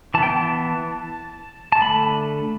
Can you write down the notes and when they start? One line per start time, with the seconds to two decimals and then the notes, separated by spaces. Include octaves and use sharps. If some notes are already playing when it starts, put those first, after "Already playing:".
0.14 E3 A5
0.18 B3 G5
0.30 A5
1.72 A5
1.82 D3 A3 B5